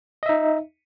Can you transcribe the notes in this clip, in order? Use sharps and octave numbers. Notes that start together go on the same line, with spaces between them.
D#4 D#5 E5